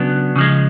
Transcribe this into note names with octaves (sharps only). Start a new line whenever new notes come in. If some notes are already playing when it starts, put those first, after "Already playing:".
Already playing: C#3 F#3 B3 D4
C#3 F3 G#3